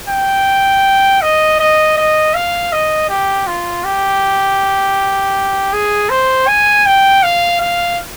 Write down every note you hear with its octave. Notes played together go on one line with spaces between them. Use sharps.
G5
D#5
D#5
D#5
F5
D#5
G4
F4
G4
G#4
C5
G#5
G5
F5
F5